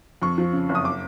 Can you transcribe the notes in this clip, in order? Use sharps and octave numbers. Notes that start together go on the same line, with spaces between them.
F2 C#6
F3
C#3
F#1
D#6
D6